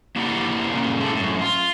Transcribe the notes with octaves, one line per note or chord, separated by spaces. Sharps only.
A#3 D4 E4 G4 D5 F#5
A#2 C#3
G#3 E4 A4 D5
F#2 A2
F4